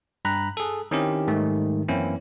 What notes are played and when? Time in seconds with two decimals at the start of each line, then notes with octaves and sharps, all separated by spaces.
0.25 G2 A#5 B5 F#6
0.57 G#4 A4
0.91 D#3 C4 C#4 E4 G4
1.28 G#2 D#3 G3 A3
1.89 F#2 E3 A#3 C4 C#4 E4